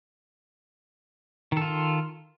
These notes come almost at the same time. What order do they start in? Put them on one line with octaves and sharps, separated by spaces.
D#3 A4 F4